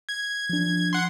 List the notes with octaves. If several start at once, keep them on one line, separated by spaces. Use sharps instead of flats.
G#6
F3 D4
F#5 C6